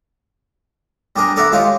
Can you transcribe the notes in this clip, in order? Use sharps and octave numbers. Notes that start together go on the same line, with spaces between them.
G3 D4 G#4 A#4
A4 A#4 D5 E5 F#5 B5
G#3 F4 G4 C#5 F5